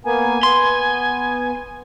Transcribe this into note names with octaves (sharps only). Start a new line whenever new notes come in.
A#3 B3 G#5
B3 C6